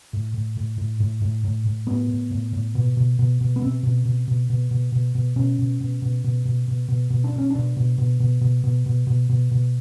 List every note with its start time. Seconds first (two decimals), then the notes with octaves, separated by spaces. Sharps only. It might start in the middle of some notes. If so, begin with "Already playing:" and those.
0.13 A2
0.34 A2
0.57 A2
0.78 A2
1.00 A2
1.22 A2
1.44 A2
1.66 A2
1.87 A2 B3
2.10 A2
2.31 A2
2.53 A2
2.75 B2
2.97 B2
3.19 B2
3.41 B2
3.56 B3
3.62 B2 C4
3.83 B2
4.05 B2
4.28 B2
4.50 B2
4.71 B2
4.92 B2
5.15 B2
5.36 B2 C#4
5.59 B2
5.80 B2
6.02 B2
6.24 B2
6.45 B2
6.68 B2
6.88 B2
7.10 B2
7.24 D4
7.32 B2
7.38 C#4
7.50 B2 D4
7.77 B2
7.98 B2
8.20 B2
8.41 B2
8.64 B2
8.86 B2
9.07 B2
9.29 B2
9.51 B2